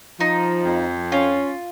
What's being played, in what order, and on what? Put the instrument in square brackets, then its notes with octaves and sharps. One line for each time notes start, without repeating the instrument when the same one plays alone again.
[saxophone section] F3 [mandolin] D#4
[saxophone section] F2
[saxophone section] C#4 [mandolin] F4